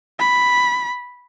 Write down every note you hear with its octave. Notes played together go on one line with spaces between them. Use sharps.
B5